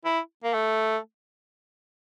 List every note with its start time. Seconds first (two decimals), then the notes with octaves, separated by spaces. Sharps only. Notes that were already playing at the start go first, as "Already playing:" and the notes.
0.05 E4
0.44 A#3
0.54 A3